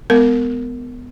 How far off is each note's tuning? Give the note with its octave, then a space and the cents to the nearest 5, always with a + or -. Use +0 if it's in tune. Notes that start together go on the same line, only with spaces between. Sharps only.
G#3 +0 B3 +15 A#4 -15